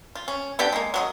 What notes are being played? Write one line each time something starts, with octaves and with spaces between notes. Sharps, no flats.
F4
C#4
B3 D4 G4 G5
G#3 A#3
F#3 F4 D#5